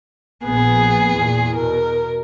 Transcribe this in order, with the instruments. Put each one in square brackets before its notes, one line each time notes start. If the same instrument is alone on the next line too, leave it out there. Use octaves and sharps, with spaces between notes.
[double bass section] A#1 B3 [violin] G#4
[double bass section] E2 A#2
[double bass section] B2 [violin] A#4